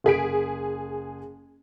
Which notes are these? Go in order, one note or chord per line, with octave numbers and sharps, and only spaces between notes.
F#1 G#4 B6 D7